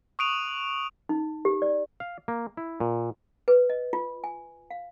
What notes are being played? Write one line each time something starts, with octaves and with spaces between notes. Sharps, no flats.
C#6 D#6 F#6 D7 D#7 F7
D#4
G4
D5
F5
A#3
E4
A#2
B4
D#5
F4
G#5
F5